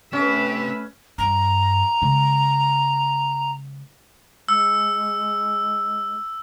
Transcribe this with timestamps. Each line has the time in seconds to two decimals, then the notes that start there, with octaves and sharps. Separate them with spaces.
0.13 A3 C4 C#4 G4 B4 E5
1.18 G2 A#5
2.02 C#3 G#3
4.49 G#3 E6